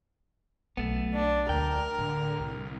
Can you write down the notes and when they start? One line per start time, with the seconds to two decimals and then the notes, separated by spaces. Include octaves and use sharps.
0.77 B1 A3 B3
1.14 D4
1.49 D2 G#3 A#4 G5
1.98 A2 D3
2.40 C2